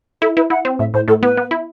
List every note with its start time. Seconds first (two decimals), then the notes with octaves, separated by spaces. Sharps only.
0.22 E4 A4
0.37 E4 B4
0.50 E4 F#5
0.65 C4
0.79 A2 E5
0.94 A2 C5
1.08 A2 A4
1.23 B3 B4
1.37 B3
1.51 E4